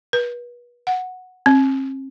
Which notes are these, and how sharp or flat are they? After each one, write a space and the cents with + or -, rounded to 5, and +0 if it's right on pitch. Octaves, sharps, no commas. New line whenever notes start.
B4 -35
F#5 -5
C4 +40